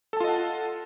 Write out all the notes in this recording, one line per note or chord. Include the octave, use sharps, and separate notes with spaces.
F4 A4 D#5 F#5 A5